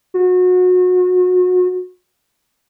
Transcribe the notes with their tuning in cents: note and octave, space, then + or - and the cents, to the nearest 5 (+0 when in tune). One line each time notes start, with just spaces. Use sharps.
F#4 -30